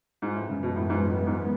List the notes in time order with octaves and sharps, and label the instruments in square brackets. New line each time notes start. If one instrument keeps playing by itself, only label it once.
[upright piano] G#2
[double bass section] F#2 E3 G#3 B3 [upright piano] A2
[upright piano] C#3
B2
A2
G#2
B2
A2
G#2